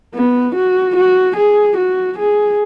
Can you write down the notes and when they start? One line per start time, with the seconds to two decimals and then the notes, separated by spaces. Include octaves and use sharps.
0.15 B3
0.55 F#4
0.96 F#4
1.37 G#4
1.77 F#4
2.18 G#4